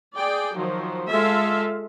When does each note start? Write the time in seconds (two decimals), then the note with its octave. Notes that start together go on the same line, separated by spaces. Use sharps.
0.16 G#4 D5 G5
0.55 D#3 F3 F#3
1.11 G#3 F4 A4 E5 F5